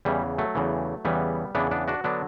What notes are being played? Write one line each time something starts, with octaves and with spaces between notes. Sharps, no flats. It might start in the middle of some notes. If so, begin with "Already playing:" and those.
E2 C#3 E3 G3
F#3 A3
E2 C#3 E3
E2 C#3 E3 G3 B3
E2 C#3 E3 B3 D4
B3 D4
D4 F#4
D3 F#3 B3 D4